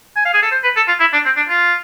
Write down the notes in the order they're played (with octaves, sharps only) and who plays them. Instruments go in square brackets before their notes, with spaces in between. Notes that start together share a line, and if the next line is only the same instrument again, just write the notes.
[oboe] G#5
F5
G#4
A4
C5
B4
A4
F4
E4
D4
C4
D4
F4